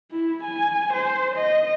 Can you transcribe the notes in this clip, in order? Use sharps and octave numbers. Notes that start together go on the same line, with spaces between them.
E4
G#5
C5
D#5